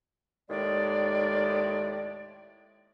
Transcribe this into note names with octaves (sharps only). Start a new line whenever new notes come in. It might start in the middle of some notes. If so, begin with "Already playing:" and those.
D#2 A2 D#3 G#3 D5